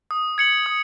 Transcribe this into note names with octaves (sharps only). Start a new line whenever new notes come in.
D#6
G#6 C#7 F#7
D#6